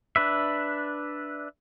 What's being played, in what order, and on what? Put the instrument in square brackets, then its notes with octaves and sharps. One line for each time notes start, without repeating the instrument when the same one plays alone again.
[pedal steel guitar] D4 B4 E5